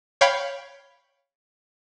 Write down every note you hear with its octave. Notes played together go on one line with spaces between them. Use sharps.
C#5 F5 G5 B5